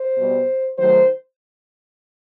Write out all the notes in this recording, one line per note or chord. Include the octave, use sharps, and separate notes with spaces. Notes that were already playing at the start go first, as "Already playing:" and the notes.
Already playing: C5
B2 G3
D#3 F#3 A3 C5